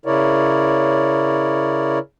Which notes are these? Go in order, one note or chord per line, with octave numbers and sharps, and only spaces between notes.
C#3 E4 A#4 C#5 D5